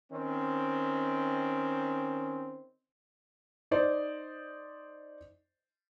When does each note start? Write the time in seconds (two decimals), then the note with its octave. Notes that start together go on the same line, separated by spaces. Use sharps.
0.11 D#3 C4 C#4
3.71 D#4 C5 D5 D#5